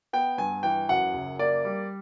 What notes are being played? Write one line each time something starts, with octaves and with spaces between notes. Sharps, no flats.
B3 G5
G2 G#5
E3 G5
F#2 F#5
F#1
A#3 D5
G3